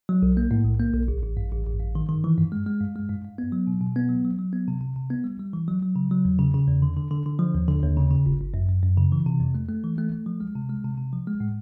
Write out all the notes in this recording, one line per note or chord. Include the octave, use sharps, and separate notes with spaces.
F#3
B1
A#3
A2
B1
A#3
B1
A1
A1
G2
A1
A1
G2
D#3
D#3
E3
G2
G#3
G#3
G2
G#3
G2
G2
B3
F#3
B2
B2
B3
F#3
F#3
F#3
B3
C3
C3
C3
B3
G3
G3
E3
F#3
F#3
C#3
F#3
E2
C#3
C#3
E2
D3
D3
D3
D3
F3
D#2
D3
D#2
C#3
C#3
G1
G1
F#2
F#2
F#2
C#3
E3
C3
F2
A3
A3
E3
A3
A3
F3
G#3
C3
G#3
C3
C3
F3
G#3
A2